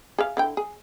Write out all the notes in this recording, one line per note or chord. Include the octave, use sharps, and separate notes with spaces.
G#4 E5 F5
D3 E4 G5
G#4